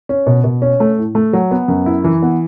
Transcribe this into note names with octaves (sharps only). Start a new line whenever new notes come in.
C#4
B2
B2
C#4
A3
A2
A3
F#3
B3
F#2
E4
E3
B3